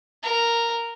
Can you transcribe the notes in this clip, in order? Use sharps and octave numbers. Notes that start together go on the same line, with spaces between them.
A#4